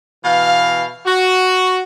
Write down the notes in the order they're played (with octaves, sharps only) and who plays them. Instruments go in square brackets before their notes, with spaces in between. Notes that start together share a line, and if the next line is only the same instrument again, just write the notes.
[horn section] B2 E3 F5
F#4